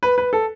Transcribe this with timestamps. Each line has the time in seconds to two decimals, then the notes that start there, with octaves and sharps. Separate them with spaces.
0.03 B4
0.18 B4
0.33 A4